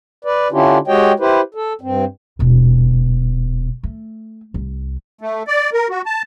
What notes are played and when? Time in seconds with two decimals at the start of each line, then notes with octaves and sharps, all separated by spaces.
0.25 B4 D5
0.52 D3 C#4 D4 E4 F4 G4
0.88 G#3 F#4 G4 C#5 D#5 G5
1.20 E4 G4 B4 C5
1.55 A4
1.81 G2 C4
2.39 D#1 B2
3.83 A3
4.54 C2
5.21 A3
5.47 D5
5.73 A#4
5.90 F#4
6.06 A5